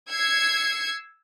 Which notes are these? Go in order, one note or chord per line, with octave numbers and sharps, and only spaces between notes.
E6 G#6 C7 C#7